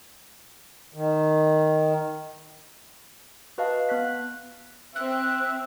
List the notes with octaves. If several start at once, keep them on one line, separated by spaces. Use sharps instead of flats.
D#3
F#4 B4 D#5 F5 A5
B3 F#6 B6
C4 E5 F#6